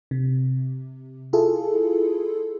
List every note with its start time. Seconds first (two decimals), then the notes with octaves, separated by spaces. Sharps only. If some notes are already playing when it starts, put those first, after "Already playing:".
0.11 C3
1.33 E4 F4 G#4 A4